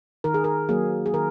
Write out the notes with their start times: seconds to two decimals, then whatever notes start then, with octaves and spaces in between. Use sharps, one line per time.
0.24 D#3 A#4
0.34 G#4
0.44 A#4
0.69 F#3 A#3 G#4
1.06 G#4
1.13 D#3 A#4